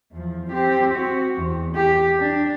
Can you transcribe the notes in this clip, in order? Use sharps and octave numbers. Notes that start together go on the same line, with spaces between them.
E2 F3
C4 G4
C4 F#4
E2
G4
D4